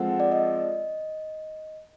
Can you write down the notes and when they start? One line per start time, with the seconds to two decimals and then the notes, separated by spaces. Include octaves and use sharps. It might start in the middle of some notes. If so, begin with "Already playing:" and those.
Already playing: F3 G#3 C4 F4 A4 F#5
0.20 D5
0.32 D#5